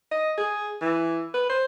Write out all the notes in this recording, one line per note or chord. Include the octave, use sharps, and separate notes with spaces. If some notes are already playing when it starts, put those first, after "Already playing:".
D#5
G#4
E3
B4
C5